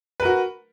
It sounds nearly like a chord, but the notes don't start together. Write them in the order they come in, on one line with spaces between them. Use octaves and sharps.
B4 A#4 F#4